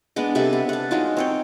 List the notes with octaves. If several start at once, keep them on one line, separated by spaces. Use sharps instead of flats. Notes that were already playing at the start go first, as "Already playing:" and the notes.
G#3 B3 D4
C3 G3 A4 E5
B3
F#5 A5
F#3 G#3 D#4 F4
C4 C#5 G5